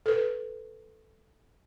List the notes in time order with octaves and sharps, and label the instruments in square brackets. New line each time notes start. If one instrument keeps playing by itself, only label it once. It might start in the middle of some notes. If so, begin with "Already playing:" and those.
[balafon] A4 B4